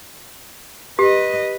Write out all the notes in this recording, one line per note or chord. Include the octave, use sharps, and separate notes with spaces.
G4 B4 D#5